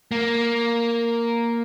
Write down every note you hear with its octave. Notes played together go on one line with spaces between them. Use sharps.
A#3